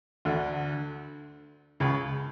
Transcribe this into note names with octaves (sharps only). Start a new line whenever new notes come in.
D2 D3
C#2 C#3